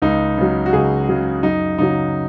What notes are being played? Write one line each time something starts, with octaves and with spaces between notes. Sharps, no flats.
C#2 D#4
C#3 F#3
F#4
C#2 G#4
C#3 F#3
F#2 D#4
C#3 F#3 D#4